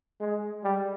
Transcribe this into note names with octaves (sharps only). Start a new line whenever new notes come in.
G#3
G3